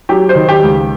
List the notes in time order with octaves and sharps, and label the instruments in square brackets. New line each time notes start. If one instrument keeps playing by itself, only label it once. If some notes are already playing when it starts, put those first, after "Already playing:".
[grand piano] F#3 G4
C5
D#3
G4
C#2